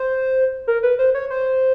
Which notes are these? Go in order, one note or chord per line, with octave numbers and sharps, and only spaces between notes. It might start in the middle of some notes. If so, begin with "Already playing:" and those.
Already playing: C5
A#4
B4
C5
C#5
C5